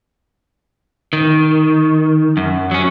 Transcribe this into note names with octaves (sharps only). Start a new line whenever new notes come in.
D#3
F#2
F#3 C#4